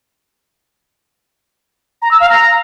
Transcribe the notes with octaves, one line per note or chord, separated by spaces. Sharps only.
A#5
E6
F5
A#5